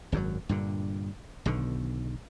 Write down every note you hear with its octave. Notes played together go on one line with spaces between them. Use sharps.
G#1 F#2 C3 F#3
G2 A#2 D3
B1 B2 D3 D#3